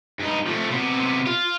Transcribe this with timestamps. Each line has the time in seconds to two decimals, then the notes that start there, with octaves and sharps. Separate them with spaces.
0.20 G2 D#4
0.47 F3 A3
0.71 C3 B3
1.27 F4